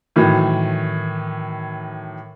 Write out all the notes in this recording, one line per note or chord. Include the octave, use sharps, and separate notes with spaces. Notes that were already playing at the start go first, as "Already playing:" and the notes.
A2 D#3 E3 F#3